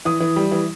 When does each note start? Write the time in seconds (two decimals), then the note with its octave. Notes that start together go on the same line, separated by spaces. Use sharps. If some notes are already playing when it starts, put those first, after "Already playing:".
0.05 E3 D#6
0.20 E3
0.36 G3
0.52 E3